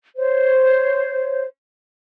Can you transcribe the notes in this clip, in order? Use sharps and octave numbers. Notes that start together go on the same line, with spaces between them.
C5 C#5